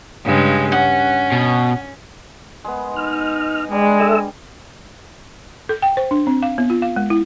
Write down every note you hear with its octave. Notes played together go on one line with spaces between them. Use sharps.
G2 C#3 G#3
C#4 F#5
B2
G#3 B3
D#4 F6
G3 G#3 D4
A4 E5 E6
A4
G5
C5
D4
C4
F5
B3
F4
F5
G#3
E4